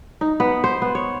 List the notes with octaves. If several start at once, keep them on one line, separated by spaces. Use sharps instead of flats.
D#4
B3
C5
B3
C#5